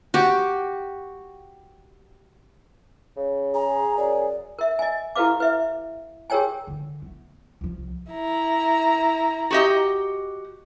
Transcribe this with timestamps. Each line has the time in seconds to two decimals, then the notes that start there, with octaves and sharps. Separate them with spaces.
0.14 F#4 G4
3.16 C#3
3.54 G#4 A#5
3.97 F#2 D5
4.59 A#4 E5
4.79 D#5 G#5
5.16 E4 G4 A4 B4 F5 D6
5.40 B4 E5
6.30 G4 G#4 A#4 C#5 G5 G#5
6.67 D3 E3
7.02 A3 B3
7.61 C2 F3
8.11 E4 A#5
9.51 F#4 G4 D#5